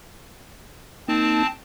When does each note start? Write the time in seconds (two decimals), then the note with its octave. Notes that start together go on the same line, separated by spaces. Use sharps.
1.08 A#3 C4 D#4 A5